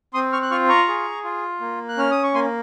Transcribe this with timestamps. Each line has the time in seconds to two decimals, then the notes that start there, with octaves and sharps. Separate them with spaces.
0.14 C4 C6 D#6
0.33 C#6 F6
0.42 F#6
0.51 F4 C#6 F6
0.69 A#5 C#6
0.88 G#4
1.24 F4
1.61 A#3
1.89 F#6
1.97 C#4 F6
2.11 D#6
2.23 C#6
2.34 A#3 G#5 C6